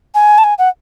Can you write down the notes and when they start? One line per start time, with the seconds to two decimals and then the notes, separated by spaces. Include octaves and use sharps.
0.14 G#5
0.38 A5
0.44 G#5
0.58 F#5